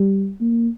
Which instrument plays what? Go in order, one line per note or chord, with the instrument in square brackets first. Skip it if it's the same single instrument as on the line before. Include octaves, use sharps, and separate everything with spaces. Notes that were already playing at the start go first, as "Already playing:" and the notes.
Already playing: [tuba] G3
A#3